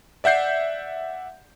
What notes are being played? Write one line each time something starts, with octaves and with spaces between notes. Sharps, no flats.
D5 E5 F#5 G6 C7